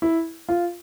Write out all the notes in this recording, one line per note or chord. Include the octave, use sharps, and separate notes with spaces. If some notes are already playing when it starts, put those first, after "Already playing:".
E4
F4